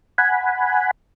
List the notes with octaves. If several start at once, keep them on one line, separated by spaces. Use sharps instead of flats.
F#5 G#5 B5